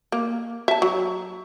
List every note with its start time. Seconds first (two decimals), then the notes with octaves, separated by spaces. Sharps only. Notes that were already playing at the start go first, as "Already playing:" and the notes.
0.12 A#3
0.68 E5 A5
0.82 F#3